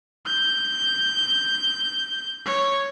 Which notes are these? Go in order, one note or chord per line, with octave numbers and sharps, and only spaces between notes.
G6
C#5